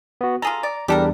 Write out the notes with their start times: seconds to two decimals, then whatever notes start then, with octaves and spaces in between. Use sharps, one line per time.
0.21 B3 F#4
0.42 F4 G#4 A4 A#5
0.63 D5
0.88 E2 G3 D4 G4 A4 A#4